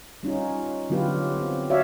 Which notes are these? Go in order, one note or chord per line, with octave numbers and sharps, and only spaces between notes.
G3 C#4 D#4 F4
D3 F#3 B3 F4 G4 B4
C4
F#4 C#5 D5 E5 F5